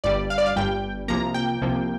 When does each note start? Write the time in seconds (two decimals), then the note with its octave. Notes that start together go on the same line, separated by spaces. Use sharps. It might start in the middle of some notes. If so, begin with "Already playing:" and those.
0.04 G1 G2 G3 D5
0.30 F5
0.38 D5
0.46 F5
0.56 G1 G2 G3 G5
1.08 C2 C3 F3 A#3 A#5
1.34 G5
1.62 C2 C3 F3 A#3